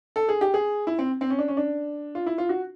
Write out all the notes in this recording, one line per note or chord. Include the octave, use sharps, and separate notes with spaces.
A4
G#4
G4
G#4
E4
C4
C4
C#4
D4
C#4
D4
F4
E4
F4
F#4